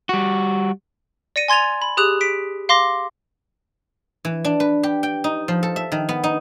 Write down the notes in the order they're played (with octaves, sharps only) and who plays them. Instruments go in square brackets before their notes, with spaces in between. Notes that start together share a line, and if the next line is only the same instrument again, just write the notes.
[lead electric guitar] G3 F#4
[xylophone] D5 A#6 C#7 D#7
G#5 C6 G#6 A6 F7
B5
G4 G#4 D#6 F#6 F7
B6 D7
F5 C6 D6 A#6
[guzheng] E3
D4
B4
G4
G5
D#4
F3
A4
E5
D#3
B3
D#4